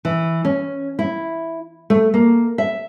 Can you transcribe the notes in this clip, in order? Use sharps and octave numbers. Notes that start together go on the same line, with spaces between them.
E3
C#4
E4
A3
A#3
E5